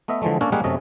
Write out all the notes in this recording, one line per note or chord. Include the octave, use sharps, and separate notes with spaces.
A3 B3 D#5 E5
D3 E3 F3 G#3 A3
A#3 C#4 D4 A4 A#4 C#5
G3 G#3 A#3 G#4 F5 F#5
F#2 C3 A3 C#4 D#5